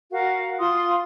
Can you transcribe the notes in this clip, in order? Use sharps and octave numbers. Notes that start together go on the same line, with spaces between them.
F#4 A#4 F5
F4 C6 D#6